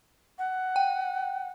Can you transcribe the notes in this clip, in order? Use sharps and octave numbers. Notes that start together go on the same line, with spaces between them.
F#5
G5